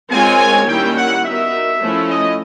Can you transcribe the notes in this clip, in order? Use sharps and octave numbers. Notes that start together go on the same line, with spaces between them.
G#3 C4 F4 A#4 C#5 G#5
D#3 G3 A#3 C#4 E4 G5
F#5
B3 D#4 F#4 A#4 E5
F3 A3 C#4 E4
D#5